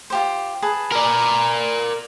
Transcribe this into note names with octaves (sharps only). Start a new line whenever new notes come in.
F4 G4 C5
G#4 B4 A5
A#4 D5